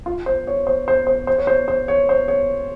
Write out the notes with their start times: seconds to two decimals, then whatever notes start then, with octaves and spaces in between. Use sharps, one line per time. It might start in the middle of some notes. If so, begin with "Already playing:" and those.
0.06 F4
0.26 C5
0.47 C#5
0.67 C5
0.88 C5
1.07 C5
1.27 C5
1.38 C#5
1.47 C5
1.68 C5
1.88 C#5
2.09 C5
2.28 C#5